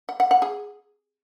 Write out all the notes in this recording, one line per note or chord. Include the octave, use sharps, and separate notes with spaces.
F#5
F#5
F#5
G#4